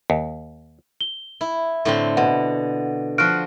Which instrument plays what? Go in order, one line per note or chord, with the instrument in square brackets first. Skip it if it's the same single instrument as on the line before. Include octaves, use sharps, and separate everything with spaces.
[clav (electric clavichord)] D#2
[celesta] G7
[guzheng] E4
A2 D3 C4
[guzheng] B2 [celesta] F#5
[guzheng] F3 F#4 [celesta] F6 F#6 D7